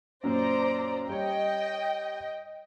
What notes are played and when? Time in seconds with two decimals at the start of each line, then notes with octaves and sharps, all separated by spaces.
0.24 F#2 A#2 C5 D5 A#5
1.10 G3 C#5 D#5 G5